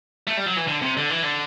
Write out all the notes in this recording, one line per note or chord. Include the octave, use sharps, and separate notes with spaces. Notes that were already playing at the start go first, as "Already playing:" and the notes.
A3
G3
F#3
E3
D3
C3
D3
E3
D3